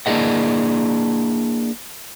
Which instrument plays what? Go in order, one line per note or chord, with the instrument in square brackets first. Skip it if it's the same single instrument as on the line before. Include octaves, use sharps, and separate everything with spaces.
[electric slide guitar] A#3 D4 E4 G#4 D#5 F#5